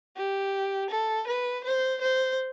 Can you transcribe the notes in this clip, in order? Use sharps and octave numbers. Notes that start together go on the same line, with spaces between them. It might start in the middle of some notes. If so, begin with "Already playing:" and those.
G4
A4
B4
C5
C5